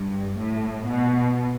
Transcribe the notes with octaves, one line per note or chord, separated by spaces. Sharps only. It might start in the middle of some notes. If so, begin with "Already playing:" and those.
Already playing: G2
A2
B2